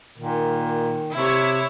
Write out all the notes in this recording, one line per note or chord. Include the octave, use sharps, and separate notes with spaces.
A#2 D#3
C3 E4 C#5